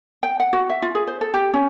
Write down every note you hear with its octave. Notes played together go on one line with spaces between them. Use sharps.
G5
F#5
F#4
E5
F4
G#4
C5
A4
G4
C#4